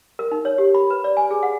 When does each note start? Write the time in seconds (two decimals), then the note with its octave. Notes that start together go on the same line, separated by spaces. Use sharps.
0.19 A#4
0.31 D#4
0.45 C#5
0.58 G4
0.75 B5
0.90 B4
1.04 D5
1.17 G#5
1.31 G#4
1.43 F#5